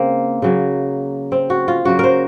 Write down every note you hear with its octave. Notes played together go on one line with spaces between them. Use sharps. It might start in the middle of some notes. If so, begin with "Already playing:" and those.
Already playing: C#3 A#3 C4
C#3 F#3 A#3
C4
F#4
F4
C#3 F#3 A#3 F#4
A#4 C5